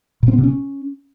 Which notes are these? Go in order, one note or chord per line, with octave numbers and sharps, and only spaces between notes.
A#2
C4
B3
C3
C#4